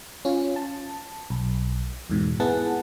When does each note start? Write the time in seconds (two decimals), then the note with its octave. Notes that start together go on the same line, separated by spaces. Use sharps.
0.25 C#4 F4
0.56 A5
1.30 B1
2.10 E2 G#2 B2
2.40 B3 E4 G#4 F#5 A5